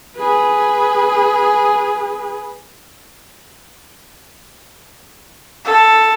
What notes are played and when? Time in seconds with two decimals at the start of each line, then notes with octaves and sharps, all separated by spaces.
0.16 G#4 B4
5.65 A4